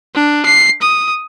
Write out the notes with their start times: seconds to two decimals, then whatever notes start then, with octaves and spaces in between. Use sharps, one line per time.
0.15 D4
0.45 C7
0.82 D#6